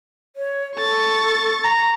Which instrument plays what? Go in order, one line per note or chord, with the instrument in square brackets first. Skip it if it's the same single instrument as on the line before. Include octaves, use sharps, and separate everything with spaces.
[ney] C#5
[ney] A4 [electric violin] C#6 A6
[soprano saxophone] A#5